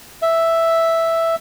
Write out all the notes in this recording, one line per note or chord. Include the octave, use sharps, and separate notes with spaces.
E5